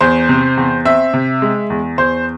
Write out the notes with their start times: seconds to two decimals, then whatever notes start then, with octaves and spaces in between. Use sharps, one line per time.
0.01 E2 C5
0.29 C3
0.57 E2
0.85 C4 E5
1.14 C3
1.42 G#3
1.70 E2
1.98 E2 C5